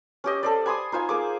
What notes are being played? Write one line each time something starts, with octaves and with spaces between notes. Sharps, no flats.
C#4 G4 D#5
A4 C5 D5
G#5 B5 C6 D#6
D#4 F4 C5 G#5
A#3 G#4 D6